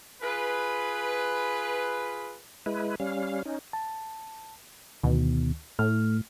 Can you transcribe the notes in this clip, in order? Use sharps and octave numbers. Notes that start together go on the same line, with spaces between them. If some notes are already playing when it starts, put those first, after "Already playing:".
F4 G#4 B4
G#3 E4 B4
G3 C#4 F5
C#4 D#4
A5
D2 B2 D#3
A2 A3 F6